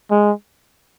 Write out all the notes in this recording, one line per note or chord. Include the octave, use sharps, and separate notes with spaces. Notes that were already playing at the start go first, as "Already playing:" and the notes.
G#3